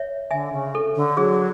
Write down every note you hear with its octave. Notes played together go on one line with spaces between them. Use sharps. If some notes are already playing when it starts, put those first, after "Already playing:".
Already playing: C#5 E5
D3 E5 G#5
C#3
A4
D3
F#3 G#4